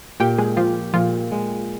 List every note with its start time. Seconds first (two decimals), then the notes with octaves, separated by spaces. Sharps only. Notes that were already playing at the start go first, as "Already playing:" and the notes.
0.20 A#2 G4 G5
0.38 G#3 G#4
0.57 F3 F4 G4
0.94 A#2 F3 F4
1.31 G#3